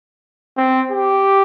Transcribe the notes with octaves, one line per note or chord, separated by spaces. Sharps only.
C4
G4